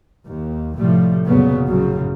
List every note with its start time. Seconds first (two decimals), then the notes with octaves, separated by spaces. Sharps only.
0.26 D#2
0.77 A2 C3 F3 G3 A3
1.26 F1 A#2 C#3 F#3 B3
1.66 A1 F#2 C#3